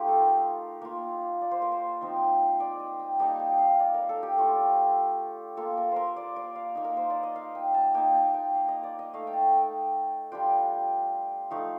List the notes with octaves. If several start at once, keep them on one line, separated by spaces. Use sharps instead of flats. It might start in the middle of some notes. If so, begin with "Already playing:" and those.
Already playing: A3 D#4 F4 G4
A4
A#4
A#3 F4
D5
C5
A#4
C5
F3 C4 D#4
D5
D#5
G5
G3 A#3 D#4 A5
G5
F5
D5
A#4
A4
G4
A3 D4 F4
A#3 F4 A4
A#4
A#4 C5
D5
D5
F5
A#3 D#4
A#4
C5
D5
D#5
F5
G5
A5
A#3 D#4 G5
A5
G5
F5
D#5
D5
D#5
A3 D#4 F5
G5
A5
G5
G3 D4 F4 G5
F3 A3 D#4 F5